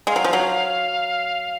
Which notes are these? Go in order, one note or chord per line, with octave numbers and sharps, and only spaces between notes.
G#3 F5
F#3
F3
F#3